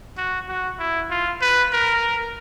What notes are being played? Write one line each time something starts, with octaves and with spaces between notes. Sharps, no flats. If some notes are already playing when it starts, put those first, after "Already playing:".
F#4
F#4
E4
F4
B4
A#4